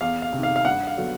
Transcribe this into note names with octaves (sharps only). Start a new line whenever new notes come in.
E2 F5
F5
C3 D#3
F5
F5
G2 F#5
F5
D3 F#3 B3